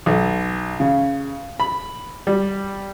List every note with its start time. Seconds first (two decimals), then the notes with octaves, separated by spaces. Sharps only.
0.06 B1
0.80 C#3
1.60 B5
2.27 G3